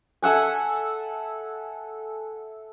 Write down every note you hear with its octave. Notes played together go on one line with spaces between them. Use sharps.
A4 E5 F#5 G#5